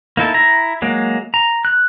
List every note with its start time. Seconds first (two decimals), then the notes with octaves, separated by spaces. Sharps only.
0.17 A#3 D#4 E4 A4
0.34 E4 A#5
0.82 F#3 G#3 A#3
1.34 A#5
1.65 F#6